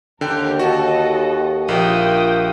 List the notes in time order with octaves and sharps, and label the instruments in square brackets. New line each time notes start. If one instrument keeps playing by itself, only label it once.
[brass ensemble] D#2 [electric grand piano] D3 G5 [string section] G4 A#4
[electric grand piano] F#4 [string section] A4 D#5
[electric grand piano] A#1 [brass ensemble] F4 G4 A#4 [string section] G5 D#6